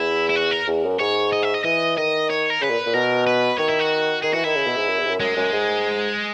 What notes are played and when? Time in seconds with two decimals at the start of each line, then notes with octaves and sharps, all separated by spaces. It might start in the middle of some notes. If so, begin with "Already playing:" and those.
Already playing: E2 E4
0.29 E4
0.36 F#4
0.51 A#4
0.67 E2
0.84 F#2
0.99 G#2 C#5
1.32 D#5
1.43 E5
1.54 D#5
1.64 E3 D#5
1.97 D#3 D#5
2.30 C#5
2.50 A#4
2.61 C#3 B4
2.70 A#2
2.86 A#2
2.94 B2 A#4
3.27 B4
3.59 D#3 C#5
3.69 E4
3.80 F#4
4.23 D#3 G#4
4.34 E3 F#4
4.44 D#3 E4
4.56 C#3
4.67 B2
4.77 G#2
4.88 F#2
4.99 E2
5.05 G#2
5.09 F#2
5.20 F#2 G#3
5.37 F#2
5.52 G#2